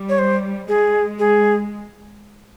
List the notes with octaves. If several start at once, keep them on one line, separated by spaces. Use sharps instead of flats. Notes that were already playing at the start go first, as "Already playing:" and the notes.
Already playing: G3
C#5
C5
G#3 G#4
G#4